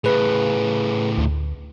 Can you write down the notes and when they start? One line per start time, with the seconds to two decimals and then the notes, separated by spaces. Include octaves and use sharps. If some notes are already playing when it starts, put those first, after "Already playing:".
0.04 A2 C#3 G#4 B4
1.18 D2